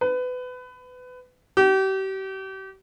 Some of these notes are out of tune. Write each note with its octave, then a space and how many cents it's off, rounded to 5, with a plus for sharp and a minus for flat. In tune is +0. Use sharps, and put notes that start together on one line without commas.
B4 +25
G4 -35